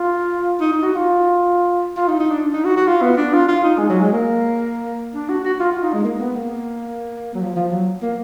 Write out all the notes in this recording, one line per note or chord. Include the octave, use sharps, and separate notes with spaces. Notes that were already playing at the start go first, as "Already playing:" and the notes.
Already playing: F4
D#4
D#4
F#4
F4
F4
D#4
D#4
D4
D#4
F#4
F#4
F4
B3
D4
F4
F4
D#4
G#3
F#3
G#3
A#3
D4
F#4
F#4
F4
F4
D#4
G#3
A#3
B3
A#3
F#3
F3
F3
F#3
A#3